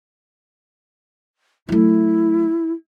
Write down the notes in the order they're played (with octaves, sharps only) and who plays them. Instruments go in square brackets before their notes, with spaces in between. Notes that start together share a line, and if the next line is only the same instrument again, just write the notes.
[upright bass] F#3 A3 [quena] E4